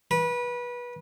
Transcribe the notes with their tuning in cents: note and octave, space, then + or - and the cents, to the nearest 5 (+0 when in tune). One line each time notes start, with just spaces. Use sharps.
B4 -25